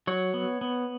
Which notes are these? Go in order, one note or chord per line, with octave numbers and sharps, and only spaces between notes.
F#3 C#5
B3
B3